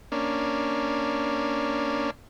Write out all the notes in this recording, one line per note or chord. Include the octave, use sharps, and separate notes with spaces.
A#3 C#4 D4